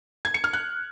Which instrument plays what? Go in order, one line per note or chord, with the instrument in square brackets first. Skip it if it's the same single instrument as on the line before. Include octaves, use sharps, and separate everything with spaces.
[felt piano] G#6
C#7
F6
F#6